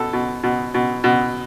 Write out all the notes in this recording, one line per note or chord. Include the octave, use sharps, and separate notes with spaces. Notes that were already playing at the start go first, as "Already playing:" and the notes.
Already playing: B2 A4
B2
B2
B2
B2